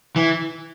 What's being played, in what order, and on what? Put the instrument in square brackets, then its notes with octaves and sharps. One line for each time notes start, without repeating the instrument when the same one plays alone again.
[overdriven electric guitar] E3